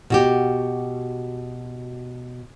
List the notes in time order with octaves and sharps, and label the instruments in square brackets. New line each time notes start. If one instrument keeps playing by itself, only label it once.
[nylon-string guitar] B2 F#4 G4